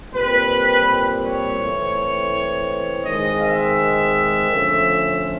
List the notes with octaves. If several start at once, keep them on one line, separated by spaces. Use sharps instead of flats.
A#2 G3 C4 B4
C#5
E3 A3 C4
D#3 G#3 C4 D#5
E5
D3 F3 A3 C#4